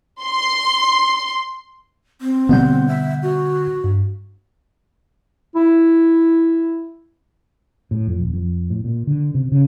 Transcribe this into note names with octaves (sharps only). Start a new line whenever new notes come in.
C6
C4
B2 D3 G3 B3 F#5 G6
E5
F#4
G2
E4
A2
F2
D#1
F2
A2
A#2
D3
C3
C#3